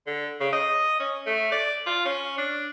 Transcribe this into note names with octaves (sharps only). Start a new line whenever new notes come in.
D3
C#3
D#5
C#4
A3
D5
F4
C#4
D4